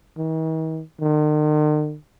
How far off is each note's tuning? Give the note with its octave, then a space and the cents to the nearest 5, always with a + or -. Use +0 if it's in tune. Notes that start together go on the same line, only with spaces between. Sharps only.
D#3 +45
D#3 -45